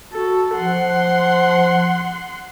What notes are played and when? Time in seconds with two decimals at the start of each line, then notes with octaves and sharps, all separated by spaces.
0.13 F#4 A4
0.55 F3 F#5 C6